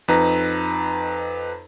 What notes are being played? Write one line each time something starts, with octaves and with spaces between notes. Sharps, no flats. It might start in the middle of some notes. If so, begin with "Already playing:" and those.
F2 D#4 B4 A#5